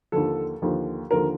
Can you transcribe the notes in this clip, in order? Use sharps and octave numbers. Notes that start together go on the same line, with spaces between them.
D#2 D3 F3 A4
D#2 D3 F3
D#2 D3 F3 A#4